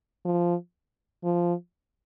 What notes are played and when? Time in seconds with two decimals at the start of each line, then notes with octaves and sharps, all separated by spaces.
0.25 F3
1.24 F3